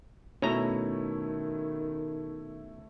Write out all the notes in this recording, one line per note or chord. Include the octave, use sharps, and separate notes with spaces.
B2 D#3 A3 C#4 E4 C#5 A#5